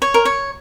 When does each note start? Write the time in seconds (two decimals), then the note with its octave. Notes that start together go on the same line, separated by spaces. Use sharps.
0.02 C#5
0.14 A#4
0.25 C#5